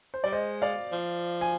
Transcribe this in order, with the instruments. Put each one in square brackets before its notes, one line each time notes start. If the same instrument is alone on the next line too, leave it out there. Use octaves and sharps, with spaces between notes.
[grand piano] C5
[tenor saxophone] G3 [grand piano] D5
[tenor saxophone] G#3 [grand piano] C5 D#5
[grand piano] D5 F5
[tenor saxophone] F3
[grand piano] G#5